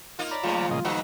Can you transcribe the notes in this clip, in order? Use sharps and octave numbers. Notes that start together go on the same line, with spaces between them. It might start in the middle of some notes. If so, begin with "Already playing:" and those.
A#3 D#4 F4
C#5 D5 A#5 B5
F2 C#3 F#3 A3 A#3 F4
D3 E3 G3
A#2 C#3 D#5
G#2 D#4 F#4 B4 F5 E6